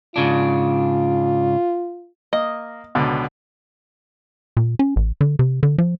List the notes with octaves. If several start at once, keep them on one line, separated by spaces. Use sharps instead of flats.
G#2 C#3 D4 F4
A#3 D#5
C#2 B2 D3
A#2
C#4
A1
D3
C3
D3
F3